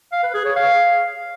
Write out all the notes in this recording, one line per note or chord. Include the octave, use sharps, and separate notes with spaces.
F5
B4
G#4
C#5
F5